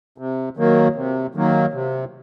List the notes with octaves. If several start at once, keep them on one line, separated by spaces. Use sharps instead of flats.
C3
D#3 F#3 A#3
C3
D#3 F#3 A#3
C3